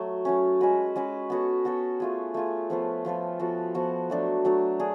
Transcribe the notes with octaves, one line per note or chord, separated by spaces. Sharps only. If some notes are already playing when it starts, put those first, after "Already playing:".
Already playing: F#3 A3
F#3 A3 C#4
G#3 C#4 F#4 B4
G#3 C#4 F#4 B4
B3 F#4 A4 C#5
B3 F#4 A4 C#5
A3 F4 G#4
A3 F4 G#4
F3 B3 F4 A4
F3 B3 F4 A4
F3 B3 F#4 A4
F3 B3 F#4 A4
F#3 A3 D4
F#3 A3 D4
D4 G#4